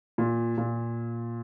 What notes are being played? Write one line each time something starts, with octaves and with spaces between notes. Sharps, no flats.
A#2
A#2